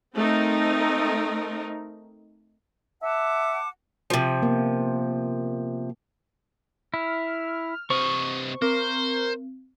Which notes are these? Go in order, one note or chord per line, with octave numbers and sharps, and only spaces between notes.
A3 C4 D#4 A#4
E5 F#5 A5 D6
C3 F3
A#3 B3
E4 F6
C3 C5 D#5 C#6
C4 A#4 C5